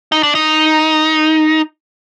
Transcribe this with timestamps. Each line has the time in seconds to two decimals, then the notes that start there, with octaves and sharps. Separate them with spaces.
0.12 D#4
0.23 D4
0.35 D#4